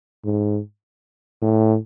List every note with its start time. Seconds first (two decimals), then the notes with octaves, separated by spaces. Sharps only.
0.25 G#2
1.42 A2